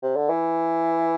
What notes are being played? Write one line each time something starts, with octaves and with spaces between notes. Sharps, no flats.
C3
D3
E3